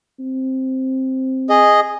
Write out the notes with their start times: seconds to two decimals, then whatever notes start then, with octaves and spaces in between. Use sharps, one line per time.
0.19 C4
1.49 G#4 D#5